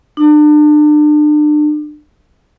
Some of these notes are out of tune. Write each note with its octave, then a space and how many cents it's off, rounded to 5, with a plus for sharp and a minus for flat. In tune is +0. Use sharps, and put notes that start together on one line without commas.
D4 +35